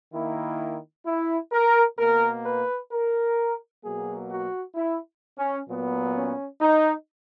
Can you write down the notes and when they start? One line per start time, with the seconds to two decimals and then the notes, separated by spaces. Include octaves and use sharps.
0.12 D#3 A#3 E4
1.05 E4
1.52 A#4
1.97 B2 A#3 A#4
2.44 B4
2.91 A#4
3.83 B2 F#3 A#3 G#4
4.29 F#4
4.74 E4
5.37 C#4
5.67 A#2 F#3 B3
6.14 C#4
6.60 D#4